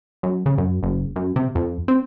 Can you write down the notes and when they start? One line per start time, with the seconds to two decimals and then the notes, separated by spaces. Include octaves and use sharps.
0.23 F#2
0.46 C#3
0.58 F#2
0.83 F#1
1.16 F#2
1.36 C3
1.55 F2
1.88 C4